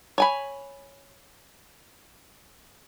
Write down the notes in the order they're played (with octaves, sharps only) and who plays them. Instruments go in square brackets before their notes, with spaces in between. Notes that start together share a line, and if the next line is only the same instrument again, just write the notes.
[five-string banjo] C#5 G#5 B5